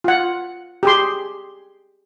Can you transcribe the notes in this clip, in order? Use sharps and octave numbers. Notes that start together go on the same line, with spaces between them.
F4 F#5
G4 G#4 C6